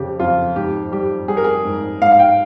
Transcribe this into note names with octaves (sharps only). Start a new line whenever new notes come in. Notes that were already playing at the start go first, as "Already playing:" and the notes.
Already playing: F2 C#3 G4
F2 F4
G#2 G4
G3 G4
G3 G#4
A#4
G#4
G#2
G#2 F5
F5
G5